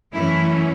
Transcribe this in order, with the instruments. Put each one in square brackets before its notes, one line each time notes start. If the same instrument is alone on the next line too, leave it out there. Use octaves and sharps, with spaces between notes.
[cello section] F#2 E3 A3 C#4 E4